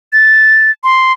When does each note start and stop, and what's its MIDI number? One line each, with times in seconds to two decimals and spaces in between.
0.13 0.71 93
0.84 1.12 84